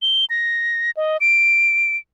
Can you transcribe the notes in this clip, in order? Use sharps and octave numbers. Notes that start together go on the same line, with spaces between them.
G7
A#6
D#5
D7